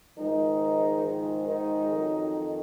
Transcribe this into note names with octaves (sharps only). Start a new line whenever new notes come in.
G#2 D#3 F3 G#3 D#4
D#3 D#4
D#3 D#4
F2 D#3 F#3